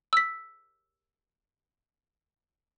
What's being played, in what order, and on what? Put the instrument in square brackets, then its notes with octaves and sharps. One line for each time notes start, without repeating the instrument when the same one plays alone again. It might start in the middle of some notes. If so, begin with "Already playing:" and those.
[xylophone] E6 B6